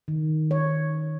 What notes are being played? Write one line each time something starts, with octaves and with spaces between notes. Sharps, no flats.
D#3
C#5